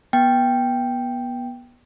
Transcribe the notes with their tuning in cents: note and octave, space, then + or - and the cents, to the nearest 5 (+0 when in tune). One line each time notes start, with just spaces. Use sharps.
B3 -25 G5 +0